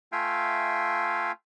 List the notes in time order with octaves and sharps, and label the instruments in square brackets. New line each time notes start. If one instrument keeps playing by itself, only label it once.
[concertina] A3 F4 E5 F5 G5 G#5